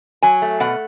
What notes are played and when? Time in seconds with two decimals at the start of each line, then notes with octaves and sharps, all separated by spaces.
0.22 F#3 G#5
0.42 A3
0.60 B2 F#5